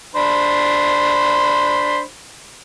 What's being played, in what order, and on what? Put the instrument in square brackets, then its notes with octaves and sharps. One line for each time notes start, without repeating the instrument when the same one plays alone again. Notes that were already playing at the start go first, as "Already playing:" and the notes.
[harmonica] D4 C5 B5